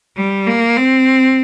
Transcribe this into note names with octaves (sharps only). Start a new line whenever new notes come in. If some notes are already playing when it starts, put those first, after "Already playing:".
G3
A#3
C4